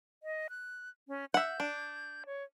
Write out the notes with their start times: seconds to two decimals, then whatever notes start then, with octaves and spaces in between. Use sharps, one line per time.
0.23 D#5
0.50 F#6
1.08 C#4
1.34 E5 F#5 G6
1.60 D4
2.26 C#5